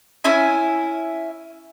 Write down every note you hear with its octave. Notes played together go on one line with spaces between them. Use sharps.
C#4 E4 E5 G#5